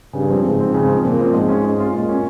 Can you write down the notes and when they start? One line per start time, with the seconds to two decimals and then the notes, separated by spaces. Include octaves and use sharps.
0.13 G2 C#3
0.29 F3 C4
0.44 G#2 C#3
0.58 F3 C4
0.74 C#3
0.88 F3 C4
1.03 A#2 C#3
1.18 F3 C4
1.33 G#2 G#3
1.48 C#4 F4
1.64 G#3
1.78 C#4 F4
1.93 A#2 G#3
2.08 C#4 F4